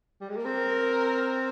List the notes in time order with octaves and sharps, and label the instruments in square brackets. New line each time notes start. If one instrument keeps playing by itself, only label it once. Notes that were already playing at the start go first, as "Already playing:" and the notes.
[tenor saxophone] G3
G#3
A#3
[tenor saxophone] C4 [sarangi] A#4